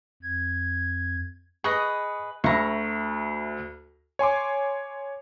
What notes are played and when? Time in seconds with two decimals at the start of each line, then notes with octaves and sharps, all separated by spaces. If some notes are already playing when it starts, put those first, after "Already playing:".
0.23 F2 G#6
1.64 G#4 B4 D#5 C#6
2.44 D2 E5 A#5 B5 C#6
4.19 C#5 G#5 C6 D6